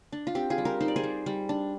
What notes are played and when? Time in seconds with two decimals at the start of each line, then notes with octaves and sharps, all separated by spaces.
0.12 D4
0.27 F4
0.35 C4 G4
0.50 F4 G#4
0.58 G3
0.65 G4 A#4
0.80 D#4 C5
0.88 D5
0.96 G#4 C5
1.03 G3
1.26 G3
1.49 D4